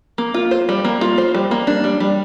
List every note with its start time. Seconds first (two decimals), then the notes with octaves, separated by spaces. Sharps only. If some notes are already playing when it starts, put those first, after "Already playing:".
0.18 A#3
0.34 F4
0.51 C5
0.69 G3
0.85 A#3
1.01 F4
1.18 C5
1.35 G3
1.51 A#3
1.67 D4
1.84 G3
2.00 G3